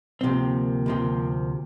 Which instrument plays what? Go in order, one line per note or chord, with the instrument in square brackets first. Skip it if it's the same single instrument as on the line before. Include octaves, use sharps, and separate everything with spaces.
[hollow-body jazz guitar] D2 C3 F3 C4 [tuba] A#3
[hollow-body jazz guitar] D2 C3 F3 C4